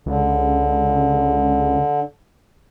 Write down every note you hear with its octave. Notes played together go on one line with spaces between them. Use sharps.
C#2 D3